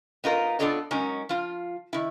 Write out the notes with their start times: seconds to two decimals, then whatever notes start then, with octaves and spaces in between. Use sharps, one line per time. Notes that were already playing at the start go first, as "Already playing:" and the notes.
0.24 B3 D#4 F4 A#4
0.59 B3 D4 F4 A4 C#5 D#5
0.91 F#3 G#3 C#4 D#4 A#4
1.29 F3 F4
1.93 D#3 E4